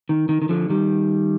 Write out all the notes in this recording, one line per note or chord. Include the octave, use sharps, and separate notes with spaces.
D#3
D#3
D#3
D3 F3
D#3 G3